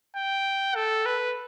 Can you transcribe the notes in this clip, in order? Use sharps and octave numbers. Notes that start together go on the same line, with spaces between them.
G5
A4
B4